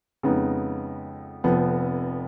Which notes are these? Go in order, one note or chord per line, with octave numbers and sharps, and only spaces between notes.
F2 C#3 G#3 B3 D#4
F1 F2 F3 B3